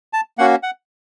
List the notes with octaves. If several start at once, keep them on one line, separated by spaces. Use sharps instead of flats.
A5
A#3 C#4 F#4 F#5
F#5